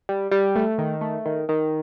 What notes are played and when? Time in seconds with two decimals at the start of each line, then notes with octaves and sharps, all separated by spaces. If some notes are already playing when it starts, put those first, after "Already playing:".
0.09 G3
0.31 G3
0.56 A3
0.78 D#3
1.01 A3
1.26 D#3
1.49 D#3